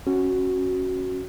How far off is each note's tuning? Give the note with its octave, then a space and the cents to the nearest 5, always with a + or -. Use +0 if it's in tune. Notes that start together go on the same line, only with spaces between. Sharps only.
C#4 -15 F#4 +0